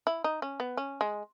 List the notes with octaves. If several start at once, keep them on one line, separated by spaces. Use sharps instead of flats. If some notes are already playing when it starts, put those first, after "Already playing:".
E4
D#4
C#4
B3
C#4
G#3